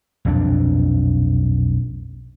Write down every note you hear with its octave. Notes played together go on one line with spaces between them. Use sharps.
B1 F2 A#2 D4